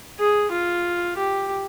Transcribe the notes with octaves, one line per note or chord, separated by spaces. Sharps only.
G#4
F4
G4